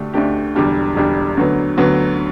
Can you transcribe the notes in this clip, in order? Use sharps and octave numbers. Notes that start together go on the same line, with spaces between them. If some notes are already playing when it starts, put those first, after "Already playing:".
Already playing: D2 D3 A3 D4 G4
D2 D3 A3 D4 G4
E1 E2 D3 G3 D4
E1 E2 D3 G3 D4
D2 D3 F#3 B3
D2 D3 F#3 B3